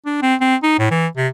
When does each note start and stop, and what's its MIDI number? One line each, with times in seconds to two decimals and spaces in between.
0.06 0.21 62
0.22 0.35 60
0.41 0.56 60
0.63 0.76 63
0.79 0.87 45
0.91 1.07 52
1.17 1.28 48